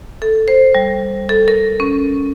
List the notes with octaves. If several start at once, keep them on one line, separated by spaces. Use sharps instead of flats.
A4
C5
G3
A4
A#4
C#4